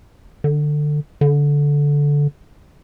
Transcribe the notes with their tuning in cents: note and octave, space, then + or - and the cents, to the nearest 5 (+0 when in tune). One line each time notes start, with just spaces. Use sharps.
D3 +20
D3 -15